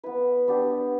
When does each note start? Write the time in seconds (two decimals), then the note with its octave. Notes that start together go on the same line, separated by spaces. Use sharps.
0.03 B3 E4 B4
0.48 B3 D4 G4